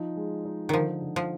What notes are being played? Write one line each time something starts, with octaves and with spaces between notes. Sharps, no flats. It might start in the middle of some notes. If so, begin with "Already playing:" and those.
Already playing: F3 D#4
G#3
D#4
D3 D#3 F3
D3
F3